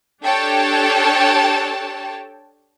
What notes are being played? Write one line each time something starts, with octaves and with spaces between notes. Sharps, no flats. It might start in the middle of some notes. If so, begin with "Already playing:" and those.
D4 G4 A4 C#5 G5 A5